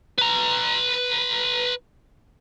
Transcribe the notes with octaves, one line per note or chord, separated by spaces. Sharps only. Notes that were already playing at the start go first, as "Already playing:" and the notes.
B4 A#5